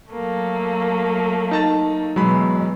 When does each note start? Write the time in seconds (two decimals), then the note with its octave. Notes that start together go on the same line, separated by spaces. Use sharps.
0.11 F#3 A3 A#3
1.51 D#4 A5 A6
2.16 B2 E3 F#3 G#3 B5